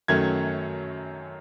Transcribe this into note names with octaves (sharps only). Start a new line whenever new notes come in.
F#2 D#3 F#3 A3 C#4 G#6